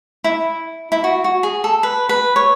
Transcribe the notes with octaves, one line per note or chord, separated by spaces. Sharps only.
E4
E4
F#4
F#4
G#4
A4
B4
B4
C#5